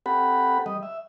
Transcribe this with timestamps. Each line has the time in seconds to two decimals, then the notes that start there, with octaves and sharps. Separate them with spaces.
0.06 C4 G4 A4 F#5 B5
0.66 G3 D#5
0.83 E5